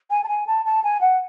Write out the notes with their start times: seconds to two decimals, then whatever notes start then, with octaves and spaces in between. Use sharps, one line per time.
0.10 G#5
0.23 A5
0.28 G#5
0.46 A5
0.65 A5
0.83 G#5
1.00 F#5